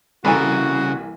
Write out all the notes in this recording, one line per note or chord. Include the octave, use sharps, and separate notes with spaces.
C2 C#3 E3 A#3 F#4 A4 G#5